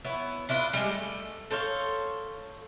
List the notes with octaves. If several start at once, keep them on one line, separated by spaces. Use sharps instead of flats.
B3 E4 C#5
D4 E4 F4 B4
G3 G#3
A3
A4 C5 C#5 F5